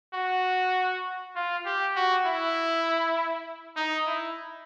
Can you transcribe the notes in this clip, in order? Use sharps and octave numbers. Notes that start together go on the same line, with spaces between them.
F#4
F4
G4
F#4
E4
D#4
E4